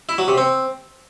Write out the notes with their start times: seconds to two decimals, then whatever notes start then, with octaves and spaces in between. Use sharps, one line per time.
0.09 E4
0.18 F#3
0.28 C3
0.38 C4